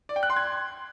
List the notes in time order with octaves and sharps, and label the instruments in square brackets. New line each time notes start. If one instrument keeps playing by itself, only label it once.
[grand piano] D5
G5
F#6
C6
G#6